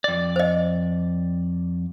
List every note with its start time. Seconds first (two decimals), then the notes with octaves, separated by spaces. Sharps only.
0.04 F2 D5
0.36 C5 D#5